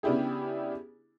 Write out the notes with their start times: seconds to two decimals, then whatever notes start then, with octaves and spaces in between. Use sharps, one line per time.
0.03 C#3 B3 D4 E4 G4 G#4